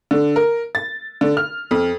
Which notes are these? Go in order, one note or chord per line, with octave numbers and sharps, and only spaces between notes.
D3
A#4
A6
D3
F6
F2